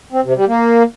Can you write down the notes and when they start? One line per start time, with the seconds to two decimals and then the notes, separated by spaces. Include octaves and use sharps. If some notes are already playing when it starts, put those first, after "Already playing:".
0.12 C4
0.24 C3
0.36 G3
0.48 A#3